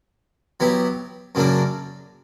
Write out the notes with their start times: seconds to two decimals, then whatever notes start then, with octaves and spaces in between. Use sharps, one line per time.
0.60 F#3 B3 E4 G4
1.35 F#2 C#3 F#3 A#3 D4